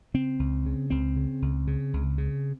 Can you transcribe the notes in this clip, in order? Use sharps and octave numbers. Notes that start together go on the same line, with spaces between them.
C#3 C4
C#2
C#3
C#2 C4
C#3
C#2
C#3
C#2
C#3